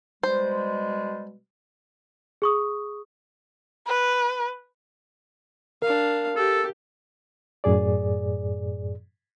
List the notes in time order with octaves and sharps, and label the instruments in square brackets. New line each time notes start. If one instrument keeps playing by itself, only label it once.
[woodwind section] B2 G3 G#3 [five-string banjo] C5
[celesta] G#4 C#6 D#6
[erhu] B4
[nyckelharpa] D4 F5 [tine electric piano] A#4
[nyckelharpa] G4 [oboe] A4
[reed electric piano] F#2 A2 G#4 D5